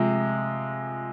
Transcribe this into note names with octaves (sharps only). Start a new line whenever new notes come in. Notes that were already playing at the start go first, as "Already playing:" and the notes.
Already playing: C3 F3 G#3